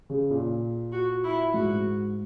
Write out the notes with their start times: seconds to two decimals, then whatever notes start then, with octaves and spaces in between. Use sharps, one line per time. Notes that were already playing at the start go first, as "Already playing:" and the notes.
0.10 C#3
0.30 A#2
0.92 F#4
1.24 E4
1.54 G#2 F#4